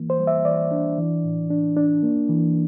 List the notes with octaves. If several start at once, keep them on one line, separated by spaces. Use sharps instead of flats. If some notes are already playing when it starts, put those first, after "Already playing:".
Already playing: E3 A#3
C5
G3
E5
E3 D5
D4
E3
A2
D4
D4
A#3
E3